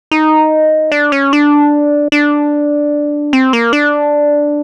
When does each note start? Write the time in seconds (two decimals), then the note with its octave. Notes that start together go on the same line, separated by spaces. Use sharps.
0.11 D#4
0.92 D4
1.12 C#4
1.33 D4
2.12 D4
3.33 C4
3.53 A#3
3.73 D4